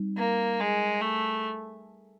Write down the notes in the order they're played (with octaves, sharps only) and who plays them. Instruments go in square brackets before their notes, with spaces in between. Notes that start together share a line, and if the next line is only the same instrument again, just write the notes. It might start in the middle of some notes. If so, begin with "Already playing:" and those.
Already playing: [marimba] G3 C4 D#4
[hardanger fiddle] A#3
G#3
A3